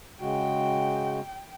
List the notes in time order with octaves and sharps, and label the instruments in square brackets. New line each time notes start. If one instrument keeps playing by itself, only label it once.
[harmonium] C#3 G#3 F#4 [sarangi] G5